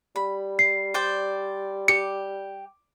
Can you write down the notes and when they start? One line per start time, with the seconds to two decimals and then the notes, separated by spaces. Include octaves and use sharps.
0.16 G3 B5
0.59 C7
0.94 C5 D5 G5
1.88 G4 C#7